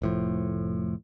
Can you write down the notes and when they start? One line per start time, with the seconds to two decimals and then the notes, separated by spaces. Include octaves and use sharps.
0.02 F1 A2 F3